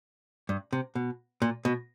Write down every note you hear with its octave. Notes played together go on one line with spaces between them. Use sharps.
G2
C3
B2
A#2
B2